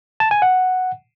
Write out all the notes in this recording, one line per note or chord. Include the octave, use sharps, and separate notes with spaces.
A5
G#5
F#5